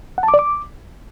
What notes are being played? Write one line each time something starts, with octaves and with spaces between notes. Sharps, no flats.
F#5
A5
D6
D5
D6